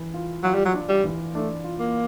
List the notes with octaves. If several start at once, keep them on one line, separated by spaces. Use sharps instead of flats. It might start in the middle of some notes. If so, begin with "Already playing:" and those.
Already playing: E3
F4
F#3 F4
G3
F#3
D4
G3
E3
A3 D4
F4
A#3